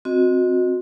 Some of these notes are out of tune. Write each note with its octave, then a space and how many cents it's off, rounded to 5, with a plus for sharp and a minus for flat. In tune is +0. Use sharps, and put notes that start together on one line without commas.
C4 +0 F#4 -25 D#5 +0